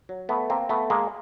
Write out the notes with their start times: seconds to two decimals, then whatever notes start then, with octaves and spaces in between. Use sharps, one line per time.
0.09 F#3
0.29 A3 B3
0.50 A#3 C4
0.69 A3 B3
0.90 G#3 A#3